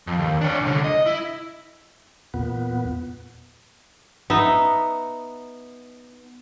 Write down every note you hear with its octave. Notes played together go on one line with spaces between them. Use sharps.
F2
D#2
D4 C#5
C2 D3
D#5
E4
E2 A#2 B3
B3 D#4 E5